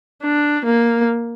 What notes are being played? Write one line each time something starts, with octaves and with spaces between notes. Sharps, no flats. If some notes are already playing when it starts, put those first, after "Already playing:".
D4
A#3